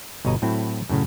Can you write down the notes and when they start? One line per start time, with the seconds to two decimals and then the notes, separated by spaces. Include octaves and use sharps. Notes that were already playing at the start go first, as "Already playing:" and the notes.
0.25 G1 B2 C#5 D#5 A#5
0.42 A2 F#3 C4 E4
0.89 F#2 A2 C#3